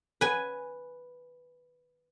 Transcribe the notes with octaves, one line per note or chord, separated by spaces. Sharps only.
B4 G#5